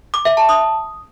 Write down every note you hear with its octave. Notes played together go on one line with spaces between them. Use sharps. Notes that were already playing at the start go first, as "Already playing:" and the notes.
D6
E5
A5
D#6